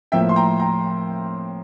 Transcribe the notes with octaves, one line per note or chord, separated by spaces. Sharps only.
A2 F3 A#3 E5 G5
C6
G5 A#5
G5 A#5